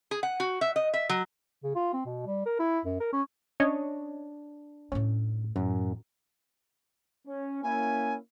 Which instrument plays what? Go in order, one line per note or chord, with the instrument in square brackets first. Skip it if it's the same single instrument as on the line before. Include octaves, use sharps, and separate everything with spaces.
[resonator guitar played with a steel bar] G#4
F#5
F#4
E5
D#5
E5
F#3
[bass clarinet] C#3
F4
C4
B2
G3
A#4
E4
F#2
A#4
C#4
[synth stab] C#4 C#5 D#5 [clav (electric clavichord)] D4
[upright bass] A2 A3 [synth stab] C#4
[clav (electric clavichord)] F#2 [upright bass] A2
[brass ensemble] C#4
[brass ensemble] A#3 C#4 E4 [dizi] G#5